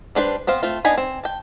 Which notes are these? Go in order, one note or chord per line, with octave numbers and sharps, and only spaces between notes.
G3 D4 B4 C5
B3 C4 C5 F5
A3 C4 F4
B3 D4 D#4 G#5 B5
C4
G5 A5